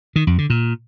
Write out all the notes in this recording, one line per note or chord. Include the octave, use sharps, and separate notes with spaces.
D#3
F2
D3
A#2